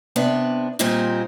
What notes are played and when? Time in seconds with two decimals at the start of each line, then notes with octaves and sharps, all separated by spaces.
0.16 C3 B3 D4
0.79 A#2 G3 A#3 C4 D#4 F4